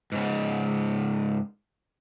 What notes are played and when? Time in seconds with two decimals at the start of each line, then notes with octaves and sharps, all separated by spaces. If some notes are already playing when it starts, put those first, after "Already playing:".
0.12 G#2 C#3